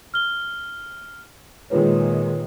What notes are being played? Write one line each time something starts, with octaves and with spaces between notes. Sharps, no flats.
F6 G7
A#2 D#3 G#3 F4 B4 C#5